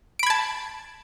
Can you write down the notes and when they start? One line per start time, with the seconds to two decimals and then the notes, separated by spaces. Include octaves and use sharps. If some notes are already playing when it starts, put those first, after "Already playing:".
0.19 D7
0.23 B5
0.26 G#6
0.30 A5